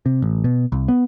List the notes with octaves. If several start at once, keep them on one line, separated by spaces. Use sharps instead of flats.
C3
A1
B2
C2
B3